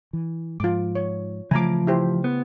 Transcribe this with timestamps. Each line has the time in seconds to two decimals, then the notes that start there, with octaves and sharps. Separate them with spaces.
0.13 E3
0.60 G#2 F3 F4 D6
0.95 C#5
1.51 C#3 E3 F3 A3 G#5 A#5 D6
1.87 E4 G4 C5
2.24 B3